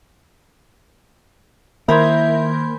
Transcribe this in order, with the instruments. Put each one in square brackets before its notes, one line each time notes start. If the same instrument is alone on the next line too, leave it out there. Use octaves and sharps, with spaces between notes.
[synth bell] D#3 A#4 G6 [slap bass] A#3 [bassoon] E4 [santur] C5 G#5 B5